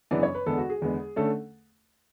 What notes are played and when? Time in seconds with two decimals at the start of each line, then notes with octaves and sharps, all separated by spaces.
0.11 F#2 C#3 E3 B3 D4 D5
0.23 C#5
0.35 B4
0.46 E2 D3 G#3 B3 A4
0.58 F#4
0.70 G#4
0.82 E2 D3 G#3 B3
1.16 D3 A3 C#4 A4